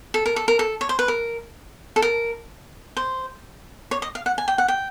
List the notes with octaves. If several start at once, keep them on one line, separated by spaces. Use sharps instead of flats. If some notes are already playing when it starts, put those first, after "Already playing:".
A4
A#4
A4
A#4
A4
C#5
C5
B4
A#4
A4
A#4
C5
C#5
D#5
F5
F#5
G#5
G5
F#5
G5